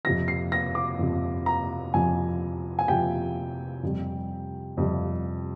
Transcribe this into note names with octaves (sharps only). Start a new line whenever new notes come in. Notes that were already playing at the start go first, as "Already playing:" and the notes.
F2 C3 F3 A#6
C7
A#6
D6
F2 C3 F3
A#5
F2 C3 F3 G#5
G#5
F2 C3 F3 G5
F2 C3 G3
F2 C3 G3